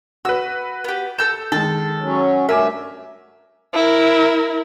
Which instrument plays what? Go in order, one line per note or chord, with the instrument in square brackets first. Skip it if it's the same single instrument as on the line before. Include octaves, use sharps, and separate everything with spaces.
[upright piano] F#4 B4 [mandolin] E6
[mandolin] B3 G4
[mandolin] A4 E6 G6 [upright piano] E7
[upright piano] D#3 G#3 [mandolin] A4
[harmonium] F#3 C#4
[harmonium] G2 A3 [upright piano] A#4 G#5 D6 [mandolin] E5
[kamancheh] E4 A#4